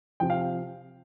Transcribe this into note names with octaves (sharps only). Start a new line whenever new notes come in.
C3 F3 G5
F5